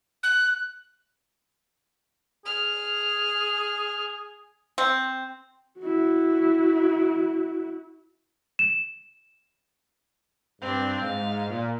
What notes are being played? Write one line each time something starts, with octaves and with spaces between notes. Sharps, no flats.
F#6
G#4 F6
C4
E4 F#4
E7
G2 C4 D4
G#2 F5
A#2